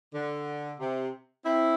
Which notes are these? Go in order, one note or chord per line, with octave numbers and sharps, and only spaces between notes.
D3
C3
C4 E4